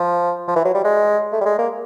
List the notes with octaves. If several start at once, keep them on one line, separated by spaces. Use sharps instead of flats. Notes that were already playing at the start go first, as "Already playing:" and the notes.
Already playing: F3
F3
E3
F#3
G3
G#3
A3
G3
G#3
A#3